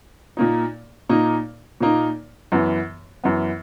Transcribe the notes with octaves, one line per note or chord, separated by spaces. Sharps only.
A#2 A#3 D#4
A#2 A#3 D#4
A#2 A#3 D#4
F#2 E3 B3
F#2 E3 B3